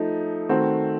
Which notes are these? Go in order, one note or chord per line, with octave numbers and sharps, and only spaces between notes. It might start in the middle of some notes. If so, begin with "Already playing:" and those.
Already playing: F3 A3 D#4
D#3 A3 C4 F#4